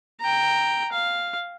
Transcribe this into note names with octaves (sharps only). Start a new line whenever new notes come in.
G5 A#5
F5